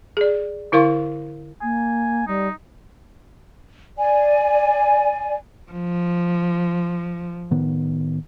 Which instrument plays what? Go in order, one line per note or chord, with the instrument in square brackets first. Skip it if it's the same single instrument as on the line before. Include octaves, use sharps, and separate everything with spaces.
[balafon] G#4 D5
D3 E4 A#4 F5 C6 C#6
[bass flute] A#3 [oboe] G#5
[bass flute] G3 [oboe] D#4
[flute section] D5 G#5
[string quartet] F3
[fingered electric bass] A2 D#3 B3